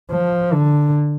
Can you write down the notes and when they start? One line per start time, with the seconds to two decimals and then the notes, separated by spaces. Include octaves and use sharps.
0.11 F3
0.54 D3